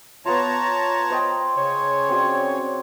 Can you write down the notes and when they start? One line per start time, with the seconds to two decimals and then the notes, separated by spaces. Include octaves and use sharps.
0.26 B3 F4 C#5 A5 A#5
1.10 C5 D#5 G5
1.56 C#3 C#5
2.09 C4 F#4 D5